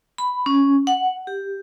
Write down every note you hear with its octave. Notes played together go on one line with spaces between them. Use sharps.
B5
C#4
F#5
G4